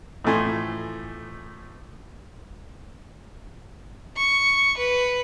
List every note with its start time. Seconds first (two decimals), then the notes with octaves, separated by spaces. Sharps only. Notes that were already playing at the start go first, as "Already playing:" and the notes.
0.24 A2 E3 F3 A3 G#5 C6
4.17 C#6
4.77 B4